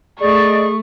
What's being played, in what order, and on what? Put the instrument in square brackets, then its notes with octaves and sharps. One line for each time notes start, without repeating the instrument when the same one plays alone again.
[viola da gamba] A3 [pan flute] G#4 [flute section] D5 D#5 [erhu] C#6